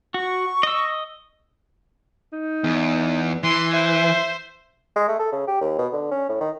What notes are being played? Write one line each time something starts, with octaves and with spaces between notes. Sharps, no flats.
F#4 C#6
D#5 E6
D#4
E2
E3 C6
C5 E5
G#3
A3
A4
C#3
G4
D#2
B2
D3
C#4
A2
D#3